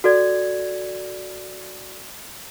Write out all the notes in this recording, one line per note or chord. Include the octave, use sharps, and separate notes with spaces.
F#4 A4 D5 G#6